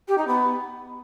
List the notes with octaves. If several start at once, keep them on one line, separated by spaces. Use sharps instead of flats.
G4
D#4
B3